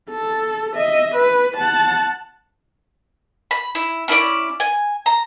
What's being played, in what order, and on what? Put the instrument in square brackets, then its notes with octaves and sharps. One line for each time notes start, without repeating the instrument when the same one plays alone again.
[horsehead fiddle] A4
D#5 E5
B4
F#5 A5
[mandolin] B5
E4
C#4 E4 B4 D5
G#5
A#5